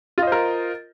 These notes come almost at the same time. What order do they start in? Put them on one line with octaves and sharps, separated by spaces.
F4 D#5 C5 A#4